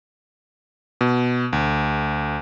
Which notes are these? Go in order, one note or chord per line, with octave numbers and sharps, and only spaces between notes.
B2
D2